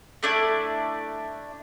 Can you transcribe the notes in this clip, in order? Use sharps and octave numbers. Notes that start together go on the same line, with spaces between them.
A3 D4 E4